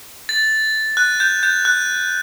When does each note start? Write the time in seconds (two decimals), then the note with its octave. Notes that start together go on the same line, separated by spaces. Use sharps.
0.29 A6
0.97 F#6
1.20 G6
1.43 G6
1.65 F#6